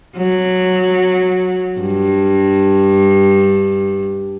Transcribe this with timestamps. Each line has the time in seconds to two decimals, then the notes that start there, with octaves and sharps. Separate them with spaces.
0.17 F#3
1.81 G2